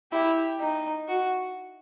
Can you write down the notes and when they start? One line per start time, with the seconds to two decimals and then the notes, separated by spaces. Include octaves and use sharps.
0.13 E4 G4
0.60 D#4
1.08 F#4